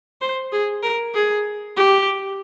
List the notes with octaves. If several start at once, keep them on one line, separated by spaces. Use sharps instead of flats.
C5
G#4
A#4
G#4
G4